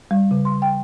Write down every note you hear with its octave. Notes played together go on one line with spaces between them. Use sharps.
G3
C#3
C6
G5